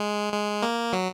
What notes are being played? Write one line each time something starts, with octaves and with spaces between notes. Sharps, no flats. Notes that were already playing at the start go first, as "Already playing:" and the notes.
Already playing: G#3
G#3
A#3
F#3